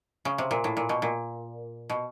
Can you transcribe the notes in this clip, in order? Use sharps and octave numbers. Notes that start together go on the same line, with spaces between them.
C#3
C3
A#2
A2
A#2
B2
A#2
B2